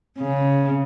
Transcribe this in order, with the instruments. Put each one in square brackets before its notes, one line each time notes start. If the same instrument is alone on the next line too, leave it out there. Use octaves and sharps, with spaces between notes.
[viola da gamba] C#3